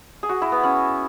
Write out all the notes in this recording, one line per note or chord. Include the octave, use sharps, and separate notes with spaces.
G#4
F#4
E4
B3
C#4